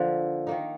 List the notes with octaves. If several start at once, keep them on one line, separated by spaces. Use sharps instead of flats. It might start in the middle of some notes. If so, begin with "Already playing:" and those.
Already playing: D3 F3 A#3
D#3 A#3 D#4